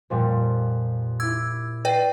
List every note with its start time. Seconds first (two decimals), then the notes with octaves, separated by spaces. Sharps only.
0.10 F2 A#2 G3
1.20 E4 D6 E6 G#6
1.85 B4 D5 G5 A6 C7